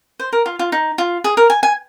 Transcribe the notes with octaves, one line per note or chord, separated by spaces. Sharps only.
C5
A#4
F4
F4
D#4
F4
G#4
A#4
G#5
G#5